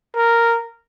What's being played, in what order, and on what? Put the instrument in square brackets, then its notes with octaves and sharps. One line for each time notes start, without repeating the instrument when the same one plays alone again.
[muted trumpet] A#4